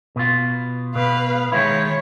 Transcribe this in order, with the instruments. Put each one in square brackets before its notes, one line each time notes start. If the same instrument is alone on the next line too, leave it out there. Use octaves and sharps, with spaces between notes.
[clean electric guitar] B2 F4
[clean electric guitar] B2 [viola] B4 F5
[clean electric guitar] D#3 G#3 E4 [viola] C#5